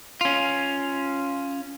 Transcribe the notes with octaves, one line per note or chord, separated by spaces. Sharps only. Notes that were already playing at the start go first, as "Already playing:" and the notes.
C#4 F4